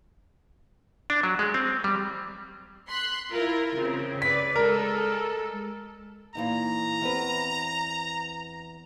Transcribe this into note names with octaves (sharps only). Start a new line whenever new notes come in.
D4
F#3
G#3
C4
G3
C6 F#6 B6
E4 F4 A#4
C#3 C4
B4 D5 B6
G#3 A4 A#4
A#2 E3 D#4 A#5
E2 C4 B4